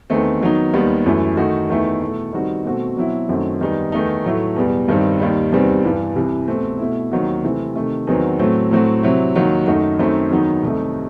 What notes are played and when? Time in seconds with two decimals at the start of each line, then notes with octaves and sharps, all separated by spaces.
0.10 E2 D#3 A3 C4
0.41 D#3 F#3 B3 D#4
0.73 D#2 D#3 G3 B3
1.06 F#2 E3 A3
1.37 D#3 A3 D#4 F#4
1.69 E2 D#3 A3 E4
2.01 B2 A3 E4
2.33 D#3 G3 C4 D#4 F#4
2.65 B2 A3 C4 F#4
2.97 B2 F#3 C4 E4
3.29 F#2 D#3 F#3 A3 C4
3.61 E2 D#3 G3 D#4
3.92 E2 D#3 A3 D#4
4.24 A2 F#3 A3 E4
4.56 E2 B2 G3
4.88 G2 D#3 G3 C4
5.20 D#2 D#3 G3
5.52 E2 C3 D#3 G3 C4
5.84 G2 E3 G3
6.16 C2 C3 E3
6.48 B2 A3 C4
6.79 B2 A3 E4
7.12 D#2 D#3 F#3 C4 F#4
7.43 C3 E3 A3 C4 E4
7.75 C3 D#3 A3
8.07 E2 D#3 F#3 C4
8.39 A2 F#3 A3 C4
8.71 A2 F#3 A3 C4 F#4
9.03 C3 F#3 C4 E4
9.35 D#2 D#3 F#3
9.67 F#2 D#3 A3 D#4 F#4
9.99 F#2 D#3 A3 C4 D#4
10.30 E2 D#3 F#3 B3 D#4
10.63 C2 C3 D#3 A3 D#4